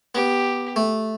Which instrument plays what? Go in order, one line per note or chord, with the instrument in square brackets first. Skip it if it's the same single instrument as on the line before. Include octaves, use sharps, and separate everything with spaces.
[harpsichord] B3 [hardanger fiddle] G4
[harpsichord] A3